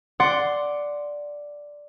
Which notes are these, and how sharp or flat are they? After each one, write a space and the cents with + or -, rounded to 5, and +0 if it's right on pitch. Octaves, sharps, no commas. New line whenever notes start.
D5 +0 F#5 +0 C6 -5